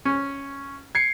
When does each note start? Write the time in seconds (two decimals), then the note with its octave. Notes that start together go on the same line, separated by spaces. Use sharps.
0.05 C#4
0.95 G#6 C7 C#7